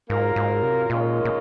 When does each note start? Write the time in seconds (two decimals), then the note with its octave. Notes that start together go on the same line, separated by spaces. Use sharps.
0.09 G#2 F#3 A#3 F4 A#4
0.36 G#2
0.63 C3
0.90 A#2 D#3 G#3 C#4 F4 A#4
1.25 A#2